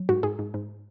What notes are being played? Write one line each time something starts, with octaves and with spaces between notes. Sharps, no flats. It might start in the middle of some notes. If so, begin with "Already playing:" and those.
Already playing: F#3
G#2 F#4
G#2 G#4
G#2
G#2